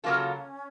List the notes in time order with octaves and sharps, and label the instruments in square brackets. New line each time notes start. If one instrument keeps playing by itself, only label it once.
[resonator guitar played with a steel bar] C#3 F#3 A#3 F4 A4 [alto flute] C#4